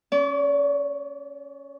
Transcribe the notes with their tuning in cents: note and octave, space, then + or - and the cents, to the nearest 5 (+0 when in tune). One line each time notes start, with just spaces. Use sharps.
C#4 +0 D5 -40